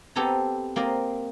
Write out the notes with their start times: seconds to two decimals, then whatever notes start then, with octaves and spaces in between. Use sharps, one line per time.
0.15 B3 C4 G4 A4 G#5 A#5
0.76 A#3 C4 D5 D#5